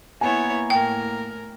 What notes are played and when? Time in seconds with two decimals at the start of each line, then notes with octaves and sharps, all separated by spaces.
0.21 A#3 B3 E4 C#5 G#5
0.70 A2 A#4 G5